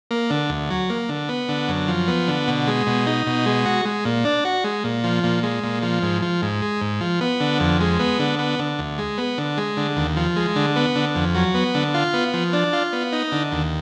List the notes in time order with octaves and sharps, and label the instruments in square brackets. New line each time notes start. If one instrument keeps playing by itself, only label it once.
[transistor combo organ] A#3
D3
D2
F#3
A#3
D3
B3
D3
F#2
F3
B3
D3
B2
G#3
B2
D#4
B2
G#3
F#4
G#3
A#2
D4
F#4
G#3
A#2
F3
A#2
G#3
A#2
F3
G#2
F3
G#2
G#3
G#2
F3
B3
D3
F2
G#3
B3
D3
B3
D3
D2
G#3
B3
D3
G#3
D3
D#2
F3
G#3
D3
B3
D3
F2
F#3
B3
D3
F4
B3
F3
D4
F4
B3
D#4
D3
D#2